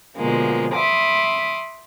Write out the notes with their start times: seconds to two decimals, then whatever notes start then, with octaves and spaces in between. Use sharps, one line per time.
0.16 B2 D3 F3 G#3 A#3
0.73 E5 B5 C6 D6 D#6